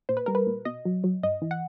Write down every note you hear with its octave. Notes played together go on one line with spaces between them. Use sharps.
A#2 C5
B4
G3 A#4
B4
A#2
B2 D#5
F#3
F#3
G2 D#5
E3
F#5